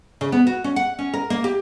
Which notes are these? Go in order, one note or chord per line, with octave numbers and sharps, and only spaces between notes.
C#3
B3
F#4
C#4
F#5
C#4
A#4
A#3
G4